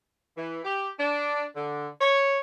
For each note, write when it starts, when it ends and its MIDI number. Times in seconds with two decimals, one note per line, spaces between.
0.37 0.60 52
0.64 0.89 67
0.99 1.43 62
1.56 1.87 50
2.01 2.38 73